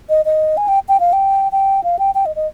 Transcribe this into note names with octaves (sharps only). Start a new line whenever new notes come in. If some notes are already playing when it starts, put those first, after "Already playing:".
D#5
D#5
G#5
G5
G5
F5
G5
G5
F5
G5
G5
D#5
D#5